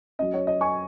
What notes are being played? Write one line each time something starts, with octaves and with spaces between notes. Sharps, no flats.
F#3 C#4 D#5
C#5
D#5
G#5 C#6